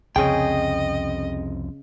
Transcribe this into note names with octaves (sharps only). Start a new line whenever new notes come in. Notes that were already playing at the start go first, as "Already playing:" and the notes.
C2 F2 C#3 C4 G#4 D#5 G5